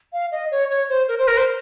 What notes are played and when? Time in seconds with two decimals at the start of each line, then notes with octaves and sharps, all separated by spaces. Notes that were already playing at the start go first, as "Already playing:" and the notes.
0.13 F5
0.32 D#5
0.51 C#5
0.70 C#5
0.89 C5
1.08 A#4
1.18 C5
1.28 A#4
1.37 C5